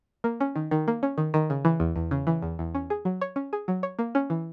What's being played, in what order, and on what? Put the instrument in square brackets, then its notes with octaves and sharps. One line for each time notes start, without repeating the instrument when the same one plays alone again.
[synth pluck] A#3
C#4
D#3
D#3
A#3
C#4
D#3
D#3
C#3
E3
E2
E2
C#3
E3
E2
E2
C#4
G#4
F#3
C#5
C#4
G#4
F#3
C#5
A#3
C#4
E3